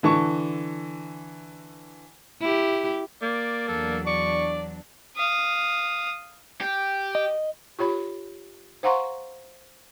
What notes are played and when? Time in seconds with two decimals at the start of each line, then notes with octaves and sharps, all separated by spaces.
0.03 D3 E3 A5 C#6
2.41 E4 G4
3.22 A#3 D5
3.68 E2 F#3 D4 A4
4.06 D5 C#6
5.16 F5 D#6
6.61 G4
7.15 D#5
7.79 F4 G4 C#5 B5
8.83 C5 F5 F#5 A#5 C6 C#6